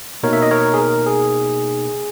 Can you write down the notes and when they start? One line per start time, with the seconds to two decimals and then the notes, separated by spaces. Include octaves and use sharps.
0.23 B2 A#3 D#4 A#4 C#5
0.33 E5
0.42 D#5
0.51 A#4 C#5
0.74 G#4
0.78 A#4
1.06 G#4